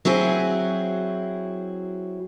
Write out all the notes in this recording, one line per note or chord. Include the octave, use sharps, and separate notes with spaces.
F#3 C4 E4 G#4